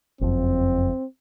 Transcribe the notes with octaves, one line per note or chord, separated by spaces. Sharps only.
F#1 F2 C4